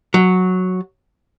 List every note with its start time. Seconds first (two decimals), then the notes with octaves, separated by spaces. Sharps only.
0.14 F#3